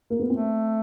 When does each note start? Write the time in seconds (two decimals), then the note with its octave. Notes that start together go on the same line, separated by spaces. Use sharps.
0.10 A#3
0.20 B3
0.30 A3 C4